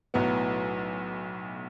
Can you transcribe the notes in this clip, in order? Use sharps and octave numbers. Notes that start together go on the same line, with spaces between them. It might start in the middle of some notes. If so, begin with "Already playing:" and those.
B1 A2 F#3 B3